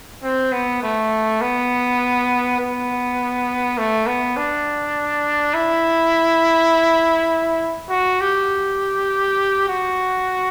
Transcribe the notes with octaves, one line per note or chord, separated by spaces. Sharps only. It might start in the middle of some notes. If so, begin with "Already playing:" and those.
C4
B3
A3
B3
B3
A3
B3
D4
E4
F#4
G4
F#4